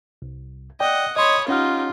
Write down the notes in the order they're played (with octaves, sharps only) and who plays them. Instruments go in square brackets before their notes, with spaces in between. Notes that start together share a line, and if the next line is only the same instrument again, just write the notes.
[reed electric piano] C2
[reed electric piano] D5 G5 [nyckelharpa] D#5 F#5
[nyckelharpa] C#5 B5 [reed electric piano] D#5 C6 [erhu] D#6
[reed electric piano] C#4 F#5 F6 [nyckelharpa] D#4 G4 [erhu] F4